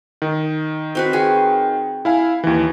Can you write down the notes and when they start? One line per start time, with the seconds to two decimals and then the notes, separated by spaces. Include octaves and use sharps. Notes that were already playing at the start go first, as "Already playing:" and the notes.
0.22 D#3
0.95 C4 F#4 B4
1.13 F#4 G#4
2.05 E4 F5 G#5
2.44 D#2 E3